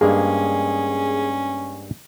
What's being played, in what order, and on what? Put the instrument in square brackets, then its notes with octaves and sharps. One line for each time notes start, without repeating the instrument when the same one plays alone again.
[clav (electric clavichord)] G2 G#3 A#3 [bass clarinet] C#4 [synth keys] G#4